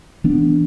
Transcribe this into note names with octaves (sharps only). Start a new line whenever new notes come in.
E3 B3 D4